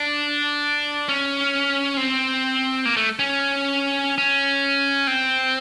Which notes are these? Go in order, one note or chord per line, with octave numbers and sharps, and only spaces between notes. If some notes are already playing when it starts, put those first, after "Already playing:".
Already playing: D4
C#4
C4
A#3
A3
C#4
C#4
C4